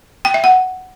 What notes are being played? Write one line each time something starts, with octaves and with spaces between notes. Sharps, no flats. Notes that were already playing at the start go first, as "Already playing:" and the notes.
G5
E5
F#5